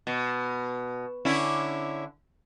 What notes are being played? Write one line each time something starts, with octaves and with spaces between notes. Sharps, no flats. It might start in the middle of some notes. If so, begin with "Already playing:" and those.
B2
D3 C#4 E4